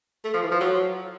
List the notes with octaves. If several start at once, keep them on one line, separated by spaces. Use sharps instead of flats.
A3
F3
E3
F3
F#3